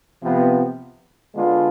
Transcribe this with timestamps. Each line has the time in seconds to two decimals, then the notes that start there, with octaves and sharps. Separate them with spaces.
0.21 C3 F3 B3
1.34 D3 G#3 B3 D4 F4